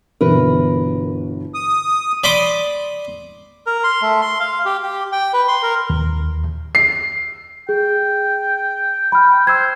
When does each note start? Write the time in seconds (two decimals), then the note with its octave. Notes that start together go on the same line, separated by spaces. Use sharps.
0.21 G1 B2 E3 A#4 B4
1.54 D#6
2.24 D5 B5 C6 D6 D#6
3.67 A#4
3.84 C6
4.02 A3
4.22 C6
4.40 F5
4.66 G4
4.83 G4
5.12 G5
5.33 B4
5.48 C6
5.63 A#4
5.90 D#2
6.75 C7
7.69 G#4 G5
9.12 B5 F6
9.47 C5 E6 G#6